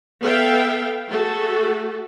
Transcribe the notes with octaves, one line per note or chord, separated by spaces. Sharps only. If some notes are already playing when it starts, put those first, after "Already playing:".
B3 A4 E5 F5 G5
A3 F#4 G#4 A4